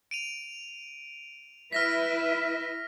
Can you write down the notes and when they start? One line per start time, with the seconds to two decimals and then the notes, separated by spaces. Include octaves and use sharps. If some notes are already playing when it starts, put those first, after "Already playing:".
0.11 D7 D#7 F7
1.72 E4 B4 E5 F6 A#6 B6